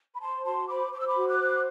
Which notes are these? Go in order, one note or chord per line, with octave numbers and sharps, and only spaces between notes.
B5
C5 A5 C6
F#4 A5 C6
C5 B5 D6
C5 D6
E6
B5 D6
F#4
D6 F#6
C5